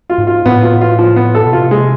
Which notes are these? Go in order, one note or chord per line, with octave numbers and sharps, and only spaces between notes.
F4
G#2
F4
A2 B3
F4
F4
F3
B3
A4
B2
C3 F4
G#3